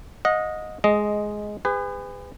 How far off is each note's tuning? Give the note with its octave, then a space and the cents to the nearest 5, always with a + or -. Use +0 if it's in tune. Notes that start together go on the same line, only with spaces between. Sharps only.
D#5 +0 F#5 -35
G#3 +5 D#5 +0
G#4 -35 B4 +30